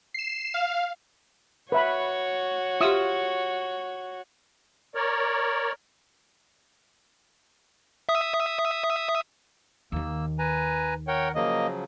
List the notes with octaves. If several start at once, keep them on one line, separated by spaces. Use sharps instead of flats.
C7 E7
F5
F#4 B4 C#5 E5 B5
F4 G4 E5 D#6 E6
A#4 C#5 D5
E5 D#6
D#2 D#3 A#3 E6
B4 G#5 A#5
A#4 C#5 F#5 G5
C#3 F3 F#3 A#3 D#5